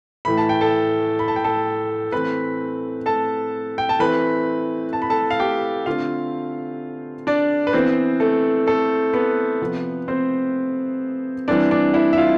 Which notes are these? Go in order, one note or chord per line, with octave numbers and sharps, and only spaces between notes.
A2 E3 A3 B5
A5
G5
A4 A5
B5
A5
G5
A4 A5
E3 A3 C4 B4 B5
A4 A5
G5
A5
E3 A3 C4 B4 B5
A5
B5
A4 A5
F5
G4 G5
D3 A3 C4 F4 F5
D4 D5
B4
E3 B3 C4 C5
A3 A4
A3 A4
B3 B4
C3 F3 B3
C4 C5
E3 G3 C4 D4 D5
D4 D5
E4 E5
E5
F4 F5